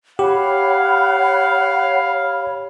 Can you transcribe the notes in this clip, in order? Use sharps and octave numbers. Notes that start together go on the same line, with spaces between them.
G4 C#5 F5 F#5 B5